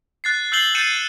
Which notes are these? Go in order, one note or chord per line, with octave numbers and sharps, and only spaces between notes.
F#6 A6 C7
E6 G6 C7 F#7 G7
G6 A6 C#7 D#7 E7 F#7